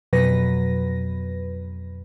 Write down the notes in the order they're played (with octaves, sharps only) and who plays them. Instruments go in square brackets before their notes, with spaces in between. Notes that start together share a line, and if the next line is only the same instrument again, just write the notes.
[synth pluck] F2 B2 F#3 B4 A#6